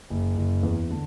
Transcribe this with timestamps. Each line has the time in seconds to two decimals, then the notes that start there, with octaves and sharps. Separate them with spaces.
0.10 F#1
0.37 F#1
0.63 E2
0.90 D3